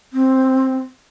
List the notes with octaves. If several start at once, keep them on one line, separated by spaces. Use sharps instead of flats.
C4